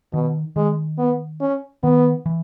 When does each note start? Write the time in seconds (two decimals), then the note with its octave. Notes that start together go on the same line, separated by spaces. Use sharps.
0.13 B2 D#3
0.56 D#3 G#3
0.98 B3
1.41 C#4
1.83 D#3 B3
2.26 E3